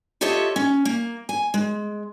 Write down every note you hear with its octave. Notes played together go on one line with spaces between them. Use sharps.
F4 G4 A4 C#5 D#5 E5
C#4
A#3
G#5
G#3